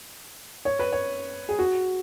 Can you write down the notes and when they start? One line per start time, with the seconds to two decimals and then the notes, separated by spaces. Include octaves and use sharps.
0.65 C#5
0.79 B4
0.92 C#5
1.49 G#4
1.59 F#4